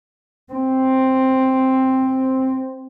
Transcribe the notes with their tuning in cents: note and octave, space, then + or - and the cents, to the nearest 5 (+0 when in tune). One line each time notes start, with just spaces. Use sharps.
C4 +5